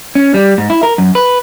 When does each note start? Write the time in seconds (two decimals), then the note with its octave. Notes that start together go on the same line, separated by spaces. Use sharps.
0.15 C#4
0.34 G3
0.58 G#2
0.70 E4
0.83 A#4
0.98 F#2
1.15 B4